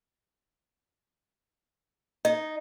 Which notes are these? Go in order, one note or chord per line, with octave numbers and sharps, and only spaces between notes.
D#4 D#5